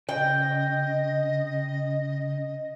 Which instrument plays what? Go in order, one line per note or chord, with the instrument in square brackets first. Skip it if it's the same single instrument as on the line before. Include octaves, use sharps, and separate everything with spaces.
[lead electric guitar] C#3 [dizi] D#5 [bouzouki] G5